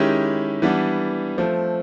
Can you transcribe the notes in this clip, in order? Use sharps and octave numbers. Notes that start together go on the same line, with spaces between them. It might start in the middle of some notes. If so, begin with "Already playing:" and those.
Already playing: D#3 G#3 C#4 E4 G4
E3 G3 B3 D4
F3 A3 C4